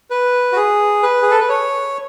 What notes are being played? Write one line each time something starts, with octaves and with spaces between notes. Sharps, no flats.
B4
F#4
G#4
B4
G#4
A4
B4
C#5